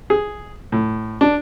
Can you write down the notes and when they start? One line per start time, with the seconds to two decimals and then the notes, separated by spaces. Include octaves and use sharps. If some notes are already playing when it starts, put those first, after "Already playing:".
0.10 G#4
0.72 A2
1.21 D4